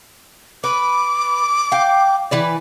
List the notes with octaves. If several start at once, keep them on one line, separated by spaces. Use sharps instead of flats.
B4 D6
F5 G5
E3 B4 D5